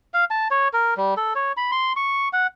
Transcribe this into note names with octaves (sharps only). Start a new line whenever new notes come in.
F5
A5
C#5
A#4
G3
A4
C#5
B5
C6
C#6
F#5